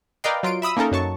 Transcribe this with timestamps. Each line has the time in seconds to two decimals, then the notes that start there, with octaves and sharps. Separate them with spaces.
0.24 A#4 B4 D5 D#5 F5 G5
0.43 F#3 F4 C6 D7
0.62 E5 B5 D#6 E6
0.77 A#3 C#4 D#4 A4 A#4
0.92 F#2 F#3 A5 C#6